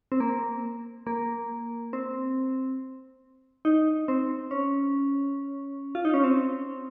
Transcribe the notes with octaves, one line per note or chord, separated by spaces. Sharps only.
C4
A#3
A#3
C4
D#4
C4
C#4
F4
D#4
C#4
C4